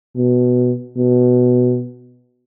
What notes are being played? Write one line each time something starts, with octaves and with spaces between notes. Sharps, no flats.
B2
B2